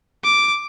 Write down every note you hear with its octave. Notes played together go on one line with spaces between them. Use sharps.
D6